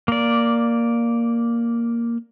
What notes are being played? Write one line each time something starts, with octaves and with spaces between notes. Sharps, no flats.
A#3 D5